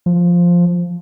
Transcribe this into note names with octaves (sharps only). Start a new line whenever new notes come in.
F3